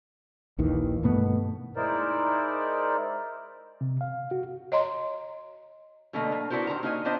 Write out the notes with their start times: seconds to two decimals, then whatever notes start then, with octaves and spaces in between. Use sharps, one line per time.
0.58 A#1 D#2 D#3 E3
1.03 G2 B2 A3 B3
1.76 G#3 D#4 E4 A#4 C5 D5
3.81 C3
4.01 F5
4.31 F#4
4.72 C#5 D#5 A#5 C6
6.13 B2 D3 F#3 A3 A#3 D#5
6.32 A#3
6.50 B3 D4 E4 F#4 A#4 C5
6.67 D#3 G#3 C5 A#5
6.83 A#3 D#4 F#4 D#5 F#5 G#5
7.05 B3 D4 F4 C5 D#5